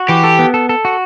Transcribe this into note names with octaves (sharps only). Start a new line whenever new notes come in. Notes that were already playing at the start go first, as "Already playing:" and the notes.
Already playing: F#4
E3 G4
A4
B3
A4
A4
F#4